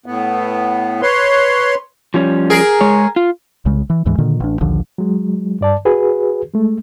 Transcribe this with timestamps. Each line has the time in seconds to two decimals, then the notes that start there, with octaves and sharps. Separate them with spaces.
0.06 A2 B3
1.02 B4 C#5 C6
2.14 F3 G3 C#4
2.50 G#4 A#4
2.81 G#3 C#5
3.16 F4
3.66 C2 C#3 G#3
3.90 E3
4.06 D2 G#2 E3 G#3
4.18 A#2 D3 D#3
4.40 A1 D4
4.61 A#1 D#2 D3 F3
4.98 F#3 G#3
5.61 G2 D5 A5
5.85 F#4 G#4 B4
6.53 G#3 A3